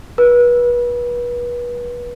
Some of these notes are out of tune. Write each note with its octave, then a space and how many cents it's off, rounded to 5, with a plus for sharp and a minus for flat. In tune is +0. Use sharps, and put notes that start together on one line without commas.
B4 -35